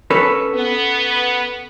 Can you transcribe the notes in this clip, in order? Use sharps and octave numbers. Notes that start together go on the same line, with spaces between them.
C#4 A4 B4
B3